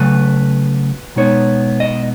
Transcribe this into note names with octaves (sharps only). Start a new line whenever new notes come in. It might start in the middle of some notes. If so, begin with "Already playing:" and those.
Already playing: C#3 F#3 A3 B4
B2 G#3 B3 D#4 C#5
D#5